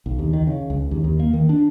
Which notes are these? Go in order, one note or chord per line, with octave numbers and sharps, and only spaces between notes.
B1
D#2
D#3
C#3
C#2
D#2
D#2
A#3
D#3
D4